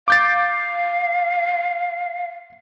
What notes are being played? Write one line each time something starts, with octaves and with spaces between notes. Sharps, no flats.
F5 D6 G6 A6